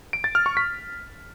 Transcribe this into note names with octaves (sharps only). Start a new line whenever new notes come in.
D7
A6
F6
C#6
B6